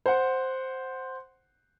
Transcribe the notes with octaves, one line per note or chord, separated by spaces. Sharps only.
C5 F#5